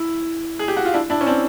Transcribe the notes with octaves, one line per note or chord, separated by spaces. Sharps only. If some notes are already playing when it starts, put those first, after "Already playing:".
Already playing: E4
G#4
G4
F#4
F4
D4 E4
D4 E4
C#4
C4 D4